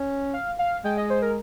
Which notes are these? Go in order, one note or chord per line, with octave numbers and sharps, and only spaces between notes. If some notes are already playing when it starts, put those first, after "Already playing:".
Already playing: C#4
F5
F5
G#3 G5
D#5
C5
A#4